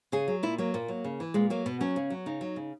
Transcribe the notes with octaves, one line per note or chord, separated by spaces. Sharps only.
C#3 G#4
F#3
A#2 E4
F#3 A#3
A#2 A#3
F#3
C#3
E3
A#2 G#3
F#3 A#3
B2 B3
F#3 C#4
C#3
F#3
C#3 D#4
F#3
C#3